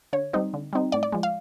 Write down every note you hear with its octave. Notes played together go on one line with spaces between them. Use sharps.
D3 C#5
G3 C4 D#4
D3
G3 C4 D#4
A2 D5
D5
F3 G#3
F5